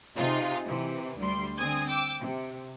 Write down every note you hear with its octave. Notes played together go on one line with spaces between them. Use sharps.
C3 D#4 F4 G#4
C3 E3
D2 G3 C6
D3 C4 G#5 D#6 G#6
G5 D6 E6
C3